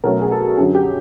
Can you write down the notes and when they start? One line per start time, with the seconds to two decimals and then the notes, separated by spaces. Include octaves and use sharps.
0.04 B2 F#3 A3 C#4 A#4
0.22 G#4
0.31 A4
0.57 F#2 D3 F#3 G#4
0.75 G4